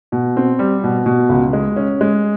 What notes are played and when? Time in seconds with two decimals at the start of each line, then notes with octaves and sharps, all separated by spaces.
0.12 B2
0.37 C4
0.59 G3
0.84 B2
1.06 B2
1.29 C#2
1.53 G#3
1.76 C#4
2.01 G#3